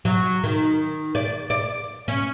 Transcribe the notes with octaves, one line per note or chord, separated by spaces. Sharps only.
F#3
D#3
D5
D5
C#4